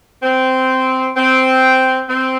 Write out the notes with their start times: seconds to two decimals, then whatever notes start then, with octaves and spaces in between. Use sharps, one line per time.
0.22 C4
1.15 C4
2.08 C4